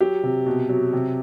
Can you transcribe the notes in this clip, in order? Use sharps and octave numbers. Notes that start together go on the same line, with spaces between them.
F#3 G4
C3
B2
F#3
C3